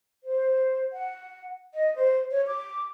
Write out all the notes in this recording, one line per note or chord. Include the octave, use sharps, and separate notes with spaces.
C5
F#5
D#5
C5
C#5
D6